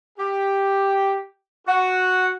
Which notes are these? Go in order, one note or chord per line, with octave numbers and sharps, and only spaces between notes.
G4
F#4